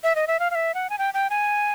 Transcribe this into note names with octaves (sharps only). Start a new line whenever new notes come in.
E5
D#5
E5
F5
F5
E5
F#5
G#5
G5
G5
G#5